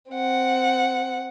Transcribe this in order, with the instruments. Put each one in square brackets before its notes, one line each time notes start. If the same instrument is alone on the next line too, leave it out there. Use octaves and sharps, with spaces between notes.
[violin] C4 F#5